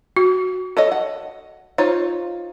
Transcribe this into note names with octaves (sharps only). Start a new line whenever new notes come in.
F#4
A4 C#5 D#5
F#5
D#4 F4 C5 C#5